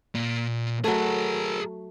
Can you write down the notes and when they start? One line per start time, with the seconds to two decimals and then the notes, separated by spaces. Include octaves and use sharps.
0.15 A#2
0.84 F#3 A3 G#4 A#4